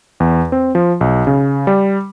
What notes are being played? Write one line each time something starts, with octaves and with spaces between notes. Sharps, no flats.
E2
C4
F3
B1
C#3
G3